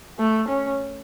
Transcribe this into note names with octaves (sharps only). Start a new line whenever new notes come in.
A3
C#4